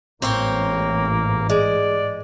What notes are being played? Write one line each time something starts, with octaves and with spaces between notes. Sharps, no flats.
A1 G#2 E3 A#3 C4 C5 C#5
G#3 D5